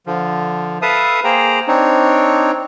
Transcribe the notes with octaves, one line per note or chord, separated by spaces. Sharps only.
D3 F3
A4 B4 E5 F5 A5 D#6
A#3 G#4 C5 G5 A#5
C4 D4 D#4 C#5